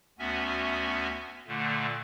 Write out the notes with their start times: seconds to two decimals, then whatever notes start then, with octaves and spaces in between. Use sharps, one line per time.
0.19 D2 B3 C#4 F#4 E5 G#5
1.47 A#2 D3 A3